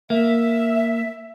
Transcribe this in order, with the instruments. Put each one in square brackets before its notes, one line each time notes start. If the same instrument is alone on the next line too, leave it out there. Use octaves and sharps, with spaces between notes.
[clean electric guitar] A#3 [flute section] E5